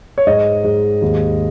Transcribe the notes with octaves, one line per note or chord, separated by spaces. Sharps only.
C#5
G#2 D#5
G#2
D#2